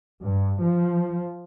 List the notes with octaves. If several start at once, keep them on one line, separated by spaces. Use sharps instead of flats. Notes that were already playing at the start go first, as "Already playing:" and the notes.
G2
F3